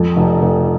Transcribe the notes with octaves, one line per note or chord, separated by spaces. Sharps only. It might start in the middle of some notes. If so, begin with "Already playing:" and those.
Already playing: F2 A4
F1
F1